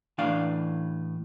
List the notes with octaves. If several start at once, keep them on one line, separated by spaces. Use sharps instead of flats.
A2 E3 D4 D5 F5